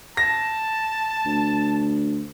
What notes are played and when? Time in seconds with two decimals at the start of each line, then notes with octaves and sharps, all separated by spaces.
0.17 A5 A#6
1.26 D2